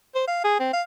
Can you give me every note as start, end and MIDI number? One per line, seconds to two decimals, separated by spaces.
0.15 0.24 72
0.28 0.40 77
0.44 0.56 68
0.59 0.70 60
0.73 0.82 77